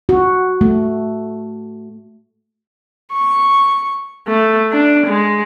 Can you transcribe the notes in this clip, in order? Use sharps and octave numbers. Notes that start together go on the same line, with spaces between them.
F#4
A3
C#6
A3
D4
G#3